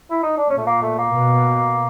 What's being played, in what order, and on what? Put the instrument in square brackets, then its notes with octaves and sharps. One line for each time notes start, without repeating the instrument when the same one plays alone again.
[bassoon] E4
D#4
D4
[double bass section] A#2 [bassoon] C#4
[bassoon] A3
A#3
A3
A#3
[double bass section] B2